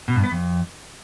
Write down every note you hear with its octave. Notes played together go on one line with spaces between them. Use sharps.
B2
G2
B3
F2